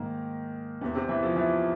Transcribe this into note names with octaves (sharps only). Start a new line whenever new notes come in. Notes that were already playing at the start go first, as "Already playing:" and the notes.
Already playing: G#2 D#3 A#3
E2 C3 E3 B3
C3 C4
E3 E4
F3 F4
E3 E4